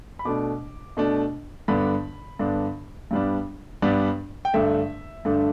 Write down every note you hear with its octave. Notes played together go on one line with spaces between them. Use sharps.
B5
B2 A3 D4 D6
B2 A3 D4
G2 D3 B3 D4 B5
G2 D3 B3 D4
G2 G3 B3 D4
G2 G3 B3 D4
G5
G2 D3 A3 D4 E5
G2 D3 A3 D4